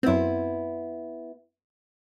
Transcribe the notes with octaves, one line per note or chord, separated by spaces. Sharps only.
F#2 B3 C4 E4